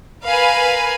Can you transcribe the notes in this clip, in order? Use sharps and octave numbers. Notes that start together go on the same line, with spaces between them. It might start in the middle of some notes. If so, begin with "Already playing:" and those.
A#4 B4 F5 G#5 B5